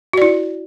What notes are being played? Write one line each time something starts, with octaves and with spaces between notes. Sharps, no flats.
E4 F#4 D5